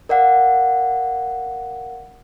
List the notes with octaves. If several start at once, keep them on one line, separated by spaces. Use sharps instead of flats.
A#4 D5 F5 F#5